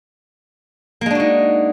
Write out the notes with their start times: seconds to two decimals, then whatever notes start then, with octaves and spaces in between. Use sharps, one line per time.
1.01 A#3
1.06 G#3
1.10 D4
1.15 F#4
1.20 D#4